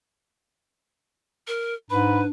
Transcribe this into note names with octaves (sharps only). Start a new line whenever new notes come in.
A#4
G#2 D4 B4 B5